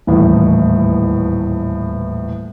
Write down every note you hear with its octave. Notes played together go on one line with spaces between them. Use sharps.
D#1 A1 E2 A2